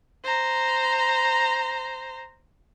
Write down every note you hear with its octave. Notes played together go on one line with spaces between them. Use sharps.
C5 A#5